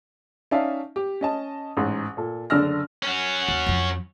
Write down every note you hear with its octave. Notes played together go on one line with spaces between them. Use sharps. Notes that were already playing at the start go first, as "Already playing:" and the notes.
C#4 D#4 D5 E5 F5 A5
G4
C#4 D#5 A5
A1 G#2
A#2 A4
F#1 D3 D5 E6 F6 A#6
C#4 F#4
D#2
F2 F3